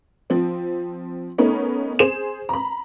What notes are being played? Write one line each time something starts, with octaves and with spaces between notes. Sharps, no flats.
F3 C4
A3 B3 C#4 D#4 A#4
G#4 C5 E7
A#5 B5